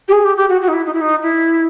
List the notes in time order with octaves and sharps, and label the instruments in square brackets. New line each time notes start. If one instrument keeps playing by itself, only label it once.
[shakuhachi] G4
G#4
G4
G4
F#4
F#4
D#4
E4
D#4
E4
D#4
E4